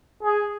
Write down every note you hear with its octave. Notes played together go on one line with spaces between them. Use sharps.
G#4